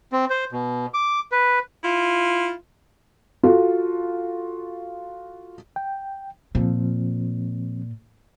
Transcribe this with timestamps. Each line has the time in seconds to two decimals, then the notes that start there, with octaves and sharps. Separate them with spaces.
0.12 C4
0.30 C5
0.52 B2
0.94 D6
1.32 B4
1.84 E4 F4
3.43 F4 F#4 A4
5.76 G5
6.55 A#2 F3 C4